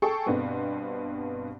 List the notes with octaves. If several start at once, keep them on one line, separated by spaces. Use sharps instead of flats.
G#4 A4 G5 C#6
G2 B2 B3 C4